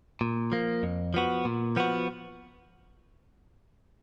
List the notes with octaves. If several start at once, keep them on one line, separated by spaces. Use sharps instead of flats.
A#2
F3 A#3
F2
F3 B3 F#4
A#2
F3 B3 F#4